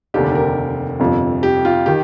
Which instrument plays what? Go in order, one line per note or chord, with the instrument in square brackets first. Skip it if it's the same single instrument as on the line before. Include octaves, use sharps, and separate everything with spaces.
[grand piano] F1 D#2 D3 G4
A#4
G1 F2 C3 F3
G4
F4
D#3 G4